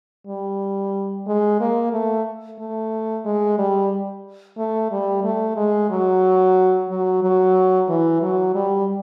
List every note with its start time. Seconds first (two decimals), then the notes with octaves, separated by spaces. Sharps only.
0.27 G3
1.27 G#3
1.60 A#3
1.93 A3
2.59 A3
3.25 G#3
3.58 G3
4.58 A3
4.91 G3
5.24 A3
5.56 G#3
5.90 F#3
6.89 F#3
7.23 F#3
7.89 E3
8.22 F#3
8.55 G3